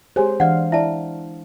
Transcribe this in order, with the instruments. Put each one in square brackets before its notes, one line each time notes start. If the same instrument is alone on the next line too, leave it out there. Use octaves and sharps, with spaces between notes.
[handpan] G#3 C5 [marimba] G4 G#4 G#5 [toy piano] C#5
[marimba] E3 [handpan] D4 F5 [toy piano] D5 F#5
[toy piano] E4 A5 [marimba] D5 E5